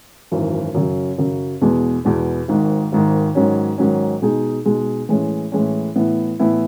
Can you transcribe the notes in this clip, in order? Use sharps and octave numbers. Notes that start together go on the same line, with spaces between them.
G#1 F#2 E3
F#2 C#3 F#3
F#2 C#3 F#3
E2 B2 G#3 B3
E2 B2 G#3 B3
G#1 G#2 D#3
G#1 G#2 D#3
G#2 D#3 F#3 C#4
G#2 D#3 F#3 C#4
B2 G#3 D#4 G#4
B2 G#3 D#4 G#4
A2 E3 G#3 C#4
A2 E3 G#3 C#4
A2 E3 B3 E4
A2 E3 B3 E4